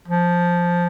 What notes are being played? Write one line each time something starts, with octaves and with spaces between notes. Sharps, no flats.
F3